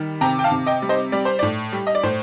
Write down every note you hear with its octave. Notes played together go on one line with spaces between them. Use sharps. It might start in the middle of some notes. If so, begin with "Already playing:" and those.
Already playing: D#3 G3
C3 G5 A#5
G5
F5 A5
C3
D#5 G5
G3
C5 D#5
G3 D5
C5
D5
A2
G3
D#5
D5
A2 C5